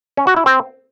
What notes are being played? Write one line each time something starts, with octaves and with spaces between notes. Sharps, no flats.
C#4
F#4
E4
C4